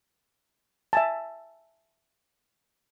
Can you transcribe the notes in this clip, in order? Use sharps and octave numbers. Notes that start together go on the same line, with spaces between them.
E5 G#5 A5